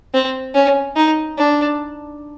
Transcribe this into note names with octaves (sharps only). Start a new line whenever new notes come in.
C4
C#4
D#4
D4